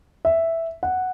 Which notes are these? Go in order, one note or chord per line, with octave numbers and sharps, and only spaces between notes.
E5
F#5